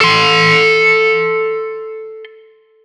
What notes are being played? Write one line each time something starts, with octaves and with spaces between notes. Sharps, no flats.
A4 C6